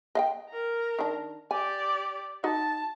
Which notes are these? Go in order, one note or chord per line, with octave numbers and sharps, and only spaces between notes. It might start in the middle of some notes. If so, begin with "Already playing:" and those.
D#5 F5 G5
A#4 A#5
D#3 D4
G4 D5 G#5
D#4 F#4 A5